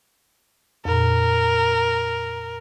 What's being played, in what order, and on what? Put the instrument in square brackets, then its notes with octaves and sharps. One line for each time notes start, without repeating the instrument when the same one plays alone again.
[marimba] F2 A#2 [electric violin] A#4